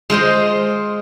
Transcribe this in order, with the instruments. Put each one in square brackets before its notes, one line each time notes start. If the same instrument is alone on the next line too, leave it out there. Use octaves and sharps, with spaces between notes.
[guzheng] G#3 F4 C5 D#5